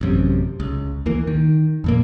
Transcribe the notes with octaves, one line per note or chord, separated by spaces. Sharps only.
A1 F#2 C3
C#2
D2 E3 A#3
D#3
F2 A#2 A#3